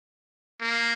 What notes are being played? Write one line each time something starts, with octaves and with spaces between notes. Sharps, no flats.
A#3